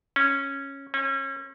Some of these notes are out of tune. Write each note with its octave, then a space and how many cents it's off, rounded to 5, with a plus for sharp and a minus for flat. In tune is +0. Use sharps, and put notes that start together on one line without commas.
C#4 -10
C#4 -35